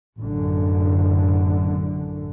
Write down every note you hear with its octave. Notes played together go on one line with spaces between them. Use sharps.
A1 F#2 D3